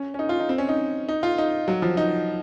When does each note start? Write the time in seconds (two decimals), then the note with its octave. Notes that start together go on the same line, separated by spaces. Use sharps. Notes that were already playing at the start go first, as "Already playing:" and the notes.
Already playing: C#4
0.14 C#4
0.19 D#4
0.29 F4
0.40 D#4
0.49 C4
0.58 C#4
0.69 D#4
1.09 D#4
1.23 F4
1.38 D#4
1.68 F#3
1.82 F3
1.97 D#4